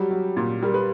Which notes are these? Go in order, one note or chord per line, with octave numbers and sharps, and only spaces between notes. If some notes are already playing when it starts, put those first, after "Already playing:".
Already playing: F#3 G3 G4
F#3
A#2
G3 A#4
B4